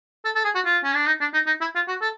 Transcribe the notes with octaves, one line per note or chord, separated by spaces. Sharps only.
A4
A4
G#4
F#4
F4
C#4
D4
D#4
D4
D#4
D#4
E4
F4
F#4
A4